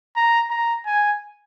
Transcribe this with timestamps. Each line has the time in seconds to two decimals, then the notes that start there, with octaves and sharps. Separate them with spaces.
0.16 A#5
0.50 A#5
0.86 G#5